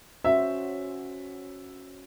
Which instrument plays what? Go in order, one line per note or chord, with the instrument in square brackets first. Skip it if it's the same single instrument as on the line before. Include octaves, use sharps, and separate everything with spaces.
[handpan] C#4 F#4 C5 [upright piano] E5